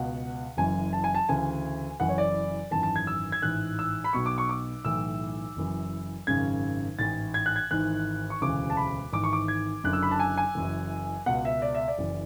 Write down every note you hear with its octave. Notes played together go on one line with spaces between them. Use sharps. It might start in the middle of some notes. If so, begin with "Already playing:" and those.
Already playing: C#2 B2 F#5
F#1 F#2 E3 G#5
A5
G#5
A5
D2 C#3 E3 G#5
F#1 F#2 E3 F#5
C#5
D5
G#1 F#2 E3 A5
A5
G#6
E6
G#6
A1 G#2 E3 F#6
E6
B5
B1 B2 C#6
D6
C#6
D6
B1 A2 E3 E6
F#1 F#2 E3
G#1 F#2 C#3 G#6
A1 G#2 E3 A6
G#6
F#6
G#6
G#1 G#2 E3 F#6
C#6
E1 D2 C#3 E3 D6
A5
B5
G#1 G#2 E3 D6
C#6
D6
G#6
F#1 F#2 D3 F#6
E6
B5
A5
G#5
G#5
F#1 F#2 E3
C#2 B2 F#5
E5
D5
E5
D5
F#1 F#2 E3